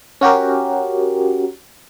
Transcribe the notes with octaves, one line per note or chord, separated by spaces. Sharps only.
C#4 F#4 G4 A#4